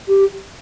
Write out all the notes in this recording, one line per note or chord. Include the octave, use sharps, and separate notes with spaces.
G4